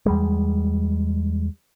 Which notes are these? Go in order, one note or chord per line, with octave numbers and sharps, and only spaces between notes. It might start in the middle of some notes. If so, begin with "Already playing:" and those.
E2 G3 G#3